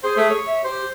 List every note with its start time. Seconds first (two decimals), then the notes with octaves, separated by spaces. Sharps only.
0.03 G#4 C5
0.17 A3
0.30 C#5
0.46 E5
0.64 G4 C5